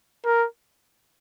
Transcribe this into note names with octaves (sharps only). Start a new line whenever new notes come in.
A#4